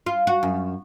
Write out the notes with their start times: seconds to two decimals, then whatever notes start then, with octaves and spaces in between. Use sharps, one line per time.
0.06 F4
0.27 F#4
0.43 F#2